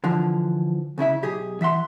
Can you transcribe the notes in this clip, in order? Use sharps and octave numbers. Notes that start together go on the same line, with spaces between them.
D3 E3 F3
C#2 C#3 E4 E5
B1 G4 G#4
E3 E5 F#5 C6